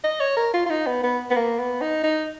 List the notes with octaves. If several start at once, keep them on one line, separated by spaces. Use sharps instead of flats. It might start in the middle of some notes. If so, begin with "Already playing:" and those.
D#5
C#5
A#4
F4
F4
D#4
B3
B3
B3
A#3
B3
D#4
D#4